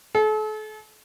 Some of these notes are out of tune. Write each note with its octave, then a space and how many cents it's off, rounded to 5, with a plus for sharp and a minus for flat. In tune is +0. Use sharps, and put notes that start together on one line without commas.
A4 -40